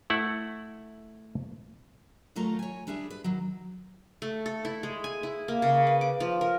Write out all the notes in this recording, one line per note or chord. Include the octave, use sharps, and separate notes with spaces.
A3 E4 F#5
D#2 F#3 A3 F4 A#4 A#5
C#5 G#5
G3 D4 E4 G#4 E5
B4
D#3 F#3
A3
A4
E4
G#3
G#5
E4
A#3
C#3
B4
D6
F3
A#4